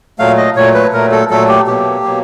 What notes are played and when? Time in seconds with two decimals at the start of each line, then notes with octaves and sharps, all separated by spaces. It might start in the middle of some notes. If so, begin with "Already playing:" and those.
0.19 A#2 F#3 A3 F5
0.37 D#5
0.56 A#2 F#3 A3 C#5
0.74 B4
0.93 A#2 F#3 A3 A#4
1.12 A4
1.30 A#2 F#3 A3 A4
1.49 G4
1.67 B2 F#3 A#3 G4
2.04 B2 F#3 A#3